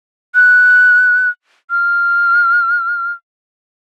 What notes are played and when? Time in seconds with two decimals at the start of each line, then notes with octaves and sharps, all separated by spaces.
0.35 F#6
1.70 F6